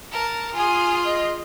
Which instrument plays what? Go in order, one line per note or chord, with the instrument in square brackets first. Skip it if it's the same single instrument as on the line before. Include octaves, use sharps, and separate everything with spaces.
[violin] A#4 A5
[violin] F4 G#4 [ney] G#5
[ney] D#5